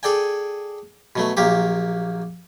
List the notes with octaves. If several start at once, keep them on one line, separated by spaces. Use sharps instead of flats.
G#4 A4 D5 G5 G#5
B2 F#3 A3
A#1 F#3 A#3 G4 D6